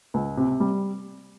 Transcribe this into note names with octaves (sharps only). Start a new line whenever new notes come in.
C#2
C3
G3